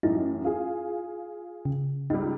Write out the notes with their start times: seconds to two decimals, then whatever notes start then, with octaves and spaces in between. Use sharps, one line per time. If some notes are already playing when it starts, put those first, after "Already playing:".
0.03 A1 F#2 D#4 E4
0.44 F4 G#4
1.65 C#3
2.10 C#2 G3 D#4